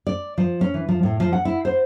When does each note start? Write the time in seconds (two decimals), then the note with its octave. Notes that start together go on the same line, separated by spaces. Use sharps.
0.07 D5
0.38 F3
0.61 C#4
0.74 E3
0.89 F3
1.03 A2
1.20 F3
1.33 F#5
1.45 E4
1.65 C5